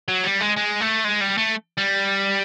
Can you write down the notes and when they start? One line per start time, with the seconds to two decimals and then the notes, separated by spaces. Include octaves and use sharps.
0.08 F#3
0.24 G3
0.40 G#3
0.56 G#3
0.81 A3
1.05 G#3
1.21 G3
1.38 A3
1.78 G3